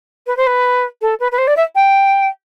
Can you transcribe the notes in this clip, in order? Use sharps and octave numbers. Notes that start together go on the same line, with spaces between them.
B4
C5
B4
A4
B4
B4
C5
D5
E5
G5